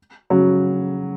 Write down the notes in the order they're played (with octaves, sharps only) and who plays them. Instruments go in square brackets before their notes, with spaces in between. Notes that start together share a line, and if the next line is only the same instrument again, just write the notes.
[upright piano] C#3 F#3